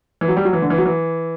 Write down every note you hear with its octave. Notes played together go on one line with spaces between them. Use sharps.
E3
F#3
G3
F#3
E3
D3
E3
F#3
E3